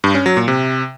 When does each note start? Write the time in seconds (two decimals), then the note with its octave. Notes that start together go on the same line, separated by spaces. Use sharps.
0.04 G2
0.15 C#4
0.26 F#3
0.37 A#2
0.48 C3